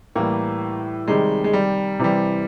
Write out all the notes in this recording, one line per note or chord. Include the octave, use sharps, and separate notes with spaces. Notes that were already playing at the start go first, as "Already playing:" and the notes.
A2 E3 G3 A#3
C3 D#3 G3 G#3
G#3
G3
C3 E3 G3